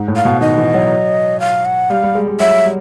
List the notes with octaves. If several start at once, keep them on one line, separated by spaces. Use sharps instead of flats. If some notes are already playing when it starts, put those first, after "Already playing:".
Already playing: G#2
A2
F5
B2
D#3 D#5
E3
F#3
F5
F#5
G3 F5
G3
G#3
G3
F#3 E5
G3